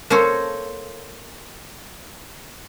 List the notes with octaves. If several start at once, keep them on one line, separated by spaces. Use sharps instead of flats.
A#3 A4 A#4 C5 C#5